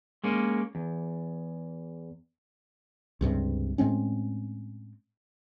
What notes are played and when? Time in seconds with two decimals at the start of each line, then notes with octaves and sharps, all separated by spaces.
0.24 G#3 A#3 C#4
0.75 E2
3.21 C#2 G2 C3
3.78 A2 G#3 C4 C#4